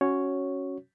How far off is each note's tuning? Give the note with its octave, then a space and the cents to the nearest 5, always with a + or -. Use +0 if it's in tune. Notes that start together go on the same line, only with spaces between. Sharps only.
C#4 -5 F#4 +0 C#5 +0